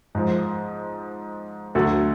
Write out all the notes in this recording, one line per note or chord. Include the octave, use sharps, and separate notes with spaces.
G#2 F3
D2 D3 F#3 F#4 A4